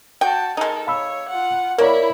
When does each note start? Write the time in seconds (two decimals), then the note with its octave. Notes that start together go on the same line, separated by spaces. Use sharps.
0.21 F#4 G5 A5
0.57 G#3 D#4 A4 A#4
0.87 C#5 F5 B5 E6
1.29 F4 F#5
1.78 A#3 E4 A#4 C#5 D5 B5